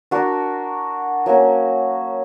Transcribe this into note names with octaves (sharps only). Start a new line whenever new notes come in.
D4 F#4 A#4
F#3 A#3 C#4